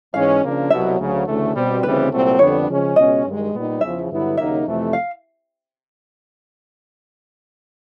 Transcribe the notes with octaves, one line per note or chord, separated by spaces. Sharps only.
G#2 E3 G#3 C#4 F5
C#3 F3 A#3 D4
C2 B2 F#3 E5
D2 C#3 F#3
D2 C#3 E3 A3
B2 G3 C4
D2 C#3 E3 G3 C4 B4
C2 A#2 F#3 A3 C4
F2 D3 G3 B3 D4 C#5
C#3 F3 G#3 C#4
C#2 B2 G#3 C#4 D#5
G2 D#3 G#3
A#2 G3 B3 D#4
E2 C#3 F3 E5
G2 D3 F#3 B3 E4
D#2 C#3 F#3 A#3 D#4 E5
F2 C3 E3 A3
F5